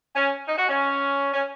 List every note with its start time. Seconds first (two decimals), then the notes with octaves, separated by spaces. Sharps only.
0.16 C#4
0.48 D#4
0.58 F#4
0.69 C#4
1.34 C#4